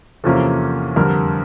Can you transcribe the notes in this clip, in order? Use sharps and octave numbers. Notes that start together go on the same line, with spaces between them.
E2 C3 F3 A#3 C#4 A4
F2 D3 G3 A#4